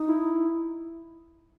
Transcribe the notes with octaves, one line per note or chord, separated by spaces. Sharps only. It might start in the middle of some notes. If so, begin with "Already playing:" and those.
Already playing: D#4
E4